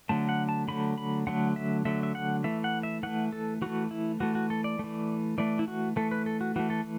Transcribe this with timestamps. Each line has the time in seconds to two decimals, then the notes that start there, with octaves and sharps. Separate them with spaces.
0.09 D3 F#3 A3 A5
0.29 F#5
0.49 A5
0.68 D3 F#3 A3 B5
0.98 B5
1.27 D3 F#3 A3 F#5
1.56 E5
1.85 D3 F#3 A3 E5
2.03 E5
2.15 F#5
2.44 E3 A3 E5
2.64 F#5
2.83 E5
3.03 E3 A3 F#5
3.33 A4
3.62 E3 A3 F#4
3.91 E4
4.20 E3 A3 F#4
4.35 F#4
4.50 A4
4.64 D5
4.79 E3 A3
5.38 E3 A3 D5
5.59 E4
5.68 F#4
5.96 E3 A3 A4
6.11 B4
6.26 A4
6.41 F#4
6.56 E3 A3 F#4
6.70 A4